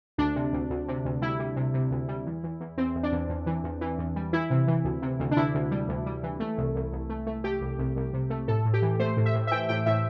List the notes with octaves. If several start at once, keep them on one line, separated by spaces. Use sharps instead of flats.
D2 D4
C3
D2
D2
C3
D2
G3 E4
G3
C3
C3
D2
G3
E2
E2
E2
E2 C4
E2
D4
E2
E2
E3
E2
E3
E2
G3
E3 E4
C3
E3
D2
C3
D2
D4
D2 E4
D2
G3
D2
G3
E3
A3
C2
C2
C2
A3
A3
A3 G4
C2
C2
C2
C3
A3
A2 A4
A2
G4
E3
A3 C5
A2
E5
A2
E5
E3 G5
A2 G5
A2 E5